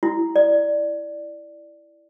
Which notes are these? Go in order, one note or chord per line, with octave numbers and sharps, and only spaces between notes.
E4
D5